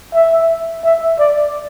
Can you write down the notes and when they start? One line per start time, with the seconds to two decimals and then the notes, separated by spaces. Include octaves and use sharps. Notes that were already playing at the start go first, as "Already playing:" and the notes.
0.14 E5
0.84 E5
1.19 D5